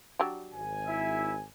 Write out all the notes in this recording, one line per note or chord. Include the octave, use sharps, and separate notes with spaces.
F#3 D4 G4
G#1 G#5
E4 E5